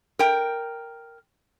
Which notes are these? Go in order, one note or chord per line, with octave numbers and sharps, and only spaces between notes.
A#4 G5